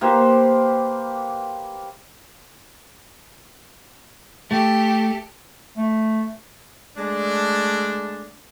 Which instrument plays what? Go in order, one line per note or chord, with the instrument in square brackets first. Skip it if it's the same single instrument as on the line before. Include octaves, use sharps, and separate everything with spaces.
[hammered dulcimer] A#3 G4 B4 C5
[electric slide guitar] A3 [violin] G4 A4
[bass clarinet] A3
[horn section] G#3 A3 D4